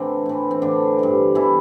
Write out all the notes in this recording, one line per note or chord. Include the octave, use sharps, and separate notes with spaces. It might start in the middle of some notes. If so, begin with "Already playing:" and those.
Already playing: A2 D3 E3 C4 D4
A2 E3
C4
A2 D3 E3 D4
G2 E3
B2 E3 E4